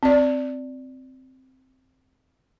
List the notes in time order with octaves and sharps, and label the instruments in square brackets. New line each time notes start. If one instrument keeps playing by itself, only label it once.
[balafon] C4 D5